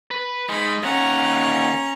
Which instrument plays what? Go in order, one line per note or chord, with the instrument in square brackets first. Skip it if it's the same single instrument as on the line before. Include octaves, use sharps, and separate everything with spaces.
[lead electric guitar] B4
[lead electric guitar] G#3 D#4 [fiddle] B5
[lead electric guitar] D#2 F#5 [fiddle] C#4 A#5